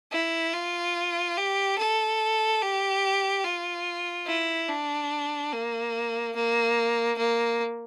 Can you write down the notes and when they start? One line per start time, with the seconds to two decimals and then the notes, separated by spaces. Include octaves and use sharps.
0.12 E4
0.54 F4
1.37 G4
1.78 A4
2.62 G4
3.45 F4
4.27 E4
4.69 D4
5.53 A#3
6.36 A#3
7.18 A#3